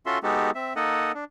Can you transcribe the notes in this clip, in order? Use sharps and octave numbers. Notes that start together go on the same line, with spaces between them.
C#4 F4 F#4 A4 E5 C6
G#3 B3 D#4 F#4 G4 A4
C4 E5
A#3 D#4 A4 D#5 F#5
D4